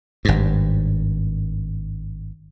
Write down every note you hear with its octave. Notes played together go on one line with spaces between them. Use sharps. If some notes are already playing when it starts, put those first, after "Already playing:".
G#1 G2